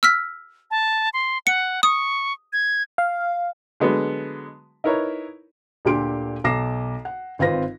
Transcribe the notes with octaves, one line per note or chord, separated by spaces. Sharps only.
E6 F6 B6
A5
C6
F#5 C#7
C#6 D#6
G#6
F5
D3 F#3 G#3 B3
D#4 E4 A#4 B4 C#5
D2 A#2 D3 G4 C6 D7
B1 A#5 D6 A#6 C7 E7
F#5
G#1 C4 F4 B4 A#6